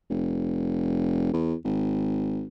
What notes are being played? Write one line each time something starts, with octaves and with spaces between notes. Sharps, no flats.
F1
E2
G#1